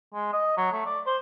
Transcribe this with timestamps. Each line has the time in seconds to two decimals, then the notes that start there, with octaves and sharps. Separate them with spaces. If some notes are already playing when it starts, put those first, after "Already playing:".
0.14 G#3
0.33 D#5
0.57 F#3
0.72 A3
0.86 D5
1.06 C5